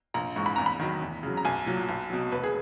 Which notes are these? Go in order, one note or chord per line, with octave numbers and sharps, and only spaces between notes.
A#1 A#5
G#2 E3 C#6
B5
E2 A#5
B5
D#3 F#3
E2
C#3 F#3
A#5
B1 G#5
A#2 F#3
B1
B2 F#3
E1 B4
G#4